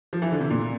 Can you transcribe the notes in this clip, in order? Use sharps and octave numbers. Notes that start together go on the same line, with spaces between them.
F3
E3
D3
C3
A#2